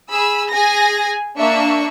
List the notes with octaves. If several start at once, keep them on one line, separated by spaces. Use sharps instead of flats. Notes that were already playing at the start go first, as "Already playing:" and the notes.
G#4 B5 E6
G#4 G#5 A#6
A#3 D4 E5 C#6